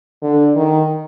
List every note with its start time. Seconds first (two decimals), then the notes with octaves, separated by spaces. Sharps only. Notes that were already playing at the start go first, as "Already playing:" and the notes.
0.22 D3
0.56 D#3